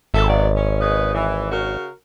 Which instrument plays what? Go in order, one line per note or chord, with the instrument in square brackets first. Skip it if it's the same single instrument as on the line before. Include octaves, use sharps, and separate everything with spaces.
[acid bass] G#1 [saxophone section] A4 E5
[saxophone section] F#3 B3 D5
C#4
C#3 B4 D#5
E3
C#3 F#4 A#4